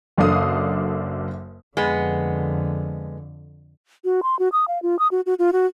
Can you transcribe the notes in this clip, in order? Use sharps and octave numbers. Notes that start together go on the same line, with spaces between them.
F#1 F#2 D4 A4 F5 D#6
F2 D3 G#3 B3
F#4
C6
F#4
D#6
F5
F4
D#6
F#4
F#4
F4
F#4